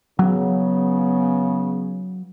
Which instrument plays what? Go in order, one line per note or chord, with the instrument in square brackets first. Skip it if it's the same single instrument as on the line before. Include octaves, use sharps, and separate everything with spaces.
[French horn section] C#3 B3 [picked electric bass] F#3